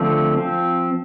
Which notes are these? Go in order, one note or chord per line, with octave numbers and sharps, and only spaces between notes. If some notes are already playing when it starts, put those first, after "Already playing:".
Already playing: D3 F3 A3 C4
F3 C4